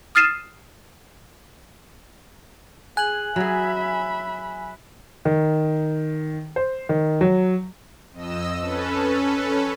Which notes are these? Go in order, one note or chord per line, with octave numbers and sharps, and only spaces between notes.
D#6 F6 A6 C7 D#7 E7
G#4 G#5 F#6 F#7
F#3 G#4 E5 B5
D#3
C5
D#3
F#3
F2 D#5 E6
C#4 A4 B4